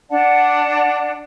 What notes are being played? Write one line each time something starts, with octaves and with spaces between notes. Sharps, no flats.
D4 D5 F#5 A5